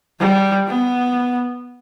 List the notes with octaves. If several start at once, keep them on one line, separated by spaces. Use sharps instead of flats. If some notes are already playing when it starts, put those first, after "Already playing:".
G3
B3